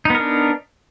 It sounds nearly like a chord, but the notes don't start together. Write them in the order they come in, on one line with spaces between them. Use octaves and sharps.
D#4 B3 A#4 D4